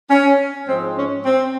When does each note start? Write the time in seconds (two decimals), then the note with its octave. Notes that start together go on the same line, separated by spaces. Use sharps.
0.10 C#4
0.66 G#2 F3 G#3 C4
0.96 C#4
1.24 C4